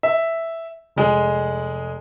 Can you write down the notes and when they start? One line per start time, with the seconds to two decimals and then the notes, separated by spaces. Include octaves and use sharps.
0.03 E5
0.96 F1 G#3 G#4